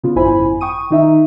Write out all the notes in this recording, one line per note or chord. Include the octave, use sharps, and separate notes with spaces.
C#3 B3 F4
G#1 F#2 E4 C5 G#5 B5
G5 C#6 D#6 D#7
D#3 D#4 E5